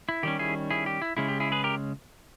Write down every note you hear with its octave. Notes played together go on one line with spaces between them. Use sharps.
E4
D#3 G3 C#4 G4
E4 G#4
E4 G#4
G4
E4
C#3 G#3 C#4 E4
G4
E4 G#4
G#4 B4
G4 A#4